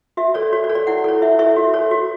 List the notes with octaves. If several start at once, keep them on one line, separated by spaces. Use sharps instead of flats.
F#4 E5
A4 C#5 D5
F#4 C#5
D5
A4 C#5
D5
E4 F#5
A4 C#5
E4 E5
A4 C#5 E5
F#4
A4 C#5
F#4